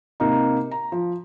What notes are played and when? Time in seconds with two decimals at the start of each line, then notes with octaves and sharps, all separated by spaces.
0.20 C3 A#3 D#4
0.71 A#5
0.92 F3